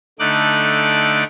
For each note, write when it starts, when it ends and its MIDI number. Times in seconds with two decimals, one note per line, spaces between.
0.19 1.23 50
0.19 1.23 57
0.19 1.23 63
0.19 1.23 86
0.19 1.23 90